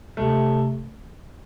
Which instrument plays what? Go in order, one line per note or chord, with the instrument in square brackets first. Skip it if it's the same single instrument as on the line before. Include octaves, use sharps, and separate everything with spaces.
[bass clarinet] C3 [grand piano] A3